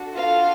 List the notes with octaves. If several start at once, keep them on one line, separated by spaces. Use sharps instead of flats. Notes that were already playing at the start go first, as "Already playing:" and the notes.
Already playing: D4 F#4 A4
F4 F5